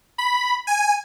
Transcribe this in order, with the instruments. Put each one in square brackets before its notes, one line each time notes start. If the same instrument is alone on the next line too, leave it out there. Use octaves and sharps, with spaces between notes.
[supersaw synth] B5
G#5